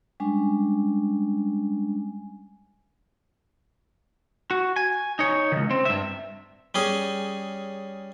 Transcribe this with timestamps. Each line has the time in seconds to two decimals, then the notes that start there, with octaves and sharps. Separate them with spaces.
0.20 G3 G#3 C#4 D4 G#5
4.51 F#4
4.76 G#5
5.19 D#4 C#5
5.52 C#2 D#3
5.71 C4
5.85 G2 E5
6.75 G3 C#4 G#4